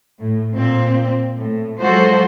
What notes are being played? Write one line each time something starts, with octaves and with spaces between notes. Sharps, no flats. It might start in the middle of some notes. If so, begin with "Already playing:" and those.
A2
A#2 C4
A2
F3 F#3 G#3 F#4 A4 C5